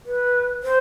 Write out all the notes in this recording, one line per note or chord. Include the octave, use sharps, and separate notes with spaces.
B4
C5